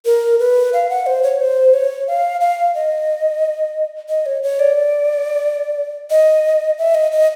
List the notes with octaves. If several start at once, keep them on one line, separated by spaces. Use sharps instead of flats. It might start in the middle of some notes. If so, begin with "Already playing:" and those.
A#4
B4
F5
F#5
C5
C#5
C5
C#5
F5
F5
D#5
D#5
C#5
C#5
D5
D#5
E5
D#5
D#5